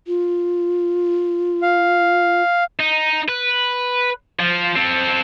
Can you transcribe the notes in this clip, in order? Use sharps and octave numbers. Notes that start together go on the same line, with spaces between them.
F4
F5
D#4
B4
F3
C4 A4